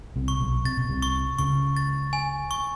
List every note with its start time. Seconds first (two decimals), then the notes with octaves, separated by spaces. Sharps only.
0.16 C2 C3
0.28 C#6
0.40 B1 B2
0.64 C3 A6
0.77 B2
0.89 C2 C3
1.02 C#6
1.38 C#2 C#3 C#6
1.76 A6
2.13 G#5
2.51 C#6